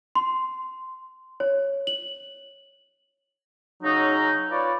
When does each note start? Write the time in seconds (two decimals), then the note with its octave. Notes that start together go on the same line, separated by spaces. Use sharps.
0.15 C6
1.40 C#5
1.87 F#7
3.83 C#3 F#3 C#4 D#4
4.50 F4 B4 C#5 D5